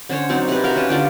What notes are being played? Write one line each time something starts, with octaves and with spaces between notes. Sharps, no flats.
D3 C#4 C5 C#5
F#3 C4 D4 D#4
C3 B4
F#4 A#4 F5
C#4 B4 A5
D3 F4 G4